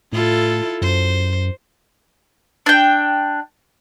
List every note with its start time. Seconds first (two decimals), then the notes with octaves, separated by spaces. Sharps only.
0.12 A2 E4 F4 A4
0.82 F#2 C5
2.66 D4 G5